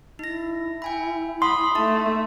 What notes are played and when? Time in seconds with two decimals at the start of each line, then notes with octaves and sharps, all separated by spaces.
0.19 D#4 E4 A#6
0.82 G5 G#5 B5
1.42 F#5 B5 C6 D#6
1.75 A3 D#4 E5 A5